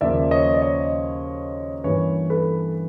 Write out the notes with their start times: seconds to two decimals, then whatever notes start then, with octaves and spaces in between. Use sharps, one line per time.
0.01 D#2 C#3 F3 A#3 D5 E5
0.31 C#5 D#5
0.54 D5
0.62 C#5 D#5
1.84 G2 E3 G3 A#3 C#4 B4 C#5
2.30 A4 B4